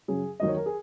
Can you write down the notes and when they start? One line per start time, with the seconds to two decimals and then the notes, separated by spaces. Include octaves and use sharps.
0.08 F#2 C#3 F#3 G#4
0.40 D#2 D#3 F#3 D#5
0.48 C#5
0.57 A#4
0.66 G#4